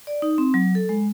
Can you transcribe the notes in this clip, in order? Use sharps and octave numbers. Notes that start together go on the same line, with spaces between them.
D5
D#4
C4
F#3
A4
G#3